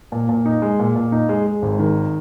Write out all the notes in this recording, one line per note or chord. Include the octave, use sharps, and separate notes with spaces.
A#2
A#2
D#4
G#3
A#2
A#2
D#4
G#3
G#3
G#1
D#3